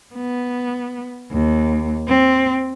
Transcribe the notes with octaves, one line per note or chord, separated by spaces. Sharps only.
B3
D#2
C4